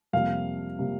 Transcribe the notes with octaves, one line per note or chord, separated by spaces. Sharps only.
F2 C3 G3 A#3 F5
C3 G3 A#3